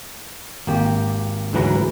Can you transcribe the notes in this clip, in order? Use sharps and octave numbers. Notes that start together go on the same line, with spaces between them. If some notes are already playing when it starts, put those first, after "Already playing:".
G#1 A#3 G4
D2 G#2 E3 F#3 B4 A#5